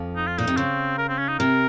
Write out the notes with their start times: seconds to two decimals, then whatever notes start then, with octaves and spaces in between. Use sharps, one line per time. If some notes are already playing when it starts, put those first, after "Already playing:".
Already playing: F2 F3
0.16 D#4
0.27 F4
0.38 A#2 D#4
0.47 C3
0.57 C#3 C4
0.98 A#4
1.09 C4
1.18 C#4
1.28 D#4
1.39 C3 A#4